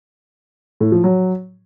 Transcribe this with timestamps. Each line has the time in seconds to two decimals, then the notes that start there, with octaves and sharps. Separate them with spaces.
0.80 A2
0.92 F3
1.04 F#3